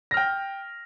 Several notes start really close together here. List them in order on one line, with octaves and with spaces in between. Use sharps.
A#6 F6 G5